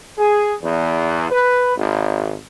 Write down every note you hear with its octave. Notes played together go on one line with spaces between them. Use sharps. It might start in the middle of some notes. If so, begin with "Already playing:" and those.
G#4
E2
B4
G#1